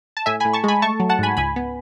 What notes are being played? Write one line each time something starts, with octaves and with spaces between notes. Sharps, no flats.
A5
A2 E5 G#5
A2 G#5 B5
A5 C#6
G#3 G#5 B5
A3 A5 C#6
F#3
F#5 A5
G#2 G#5 B5
C#2 G#5 B5
B3